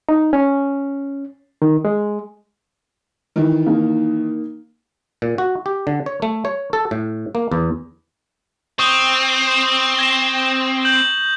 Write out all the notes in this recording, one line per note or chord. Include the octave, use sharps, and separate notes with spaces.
D#4
C#4
D#3
G#3
D#3 E3
A#3 D#4
A#2
F#4
G4
D3
C#5
A3
C#5
A4
A2
A#3
E2
C4 C#6 D#6
G#6 A#6 E7
G6 F#7